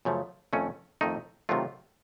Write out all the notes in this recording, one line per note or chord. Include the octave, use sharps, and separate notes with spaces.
F#2 C#3 F3 A3
F2 D#3 A3 C#4
F2 D#3 A3 D#4
C3 D#3 F#3 A3 F4